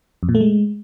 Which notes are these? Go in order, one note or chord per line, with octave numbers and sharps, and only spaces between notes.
F2
A#2
A3
G#3